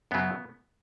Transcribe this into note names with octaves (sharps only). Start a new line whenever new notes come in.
F#2 C#3 F#3 B3